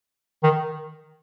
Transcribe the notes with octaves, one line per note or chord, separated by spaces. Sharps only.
D#3